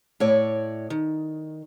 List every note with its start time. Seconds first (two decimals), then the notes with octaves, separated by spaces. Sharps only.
0.20 A2 C#5 D5
0.90 D#3